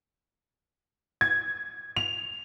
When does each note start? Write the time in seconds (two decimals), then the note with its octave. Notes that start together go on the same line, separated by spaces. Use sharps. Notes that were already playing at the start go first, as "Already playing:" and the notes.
1.21 G#6
1.97 F7